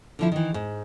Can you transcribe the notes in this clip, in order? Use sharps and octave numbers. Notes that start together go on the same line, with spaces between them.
D3 F3 E4
D#3 E3
G#2